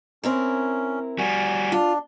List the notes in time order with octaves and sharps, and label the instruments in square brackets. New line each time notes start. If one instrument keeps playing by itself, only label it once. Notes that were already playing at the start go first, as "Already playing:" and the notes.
[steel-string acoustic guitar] C4 E4 A#4 [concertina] C#4
[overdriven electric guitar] G3 F#4 [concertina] G#5
[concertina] D4 [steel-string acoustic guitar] F4